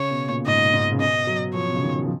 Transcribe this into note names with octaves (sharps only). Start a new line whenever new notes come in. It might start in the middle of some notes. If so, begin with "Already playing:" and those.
Already playing: C#3 C#5
B2
A#2
G#2 D#5
G#2
C#3
B2 D#5
F#3
F3 C#5
B2
C#3
D#3
F3
F3